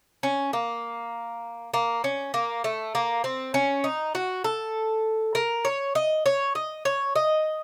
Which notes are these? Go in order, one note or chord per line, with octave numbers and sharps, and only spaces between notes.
C#4
A#3
A#3
C#4
A#3
A3
A#3
C4
C#4
D#4
F#4
A4
A#4
C#5
D#5
C#5
D#5
C#5
D#5